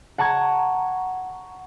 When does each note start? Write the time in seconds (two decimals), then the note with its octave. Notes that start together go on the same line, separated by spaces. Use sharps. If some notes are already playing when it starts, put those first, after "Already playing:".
0.18 F#5 A5 A#5 C#6 G#6